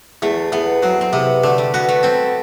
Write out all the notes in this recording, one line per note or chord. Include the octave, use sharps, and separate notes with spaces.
E2 A3
E2 B3
F#3 C4
C4
C3 B3
D3 A3
G3
B3 F#4
A3
G3 C4